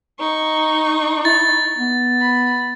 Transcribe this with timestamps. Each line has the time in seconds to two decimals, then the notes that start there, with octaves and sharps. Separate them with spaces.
0.20 D#4 C#6
1.25 E4 A6
1.77 B3
2.21 B5